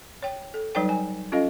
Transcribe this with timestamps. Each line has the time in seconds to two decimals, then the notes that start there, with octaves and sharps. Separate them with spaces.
0.22 C#5 G5
0.54 A4
0.75 F#3 G3 D#4 B4 C#5 G5
0.89 G#5
1.32 C#4 F4 A4 D#5 F5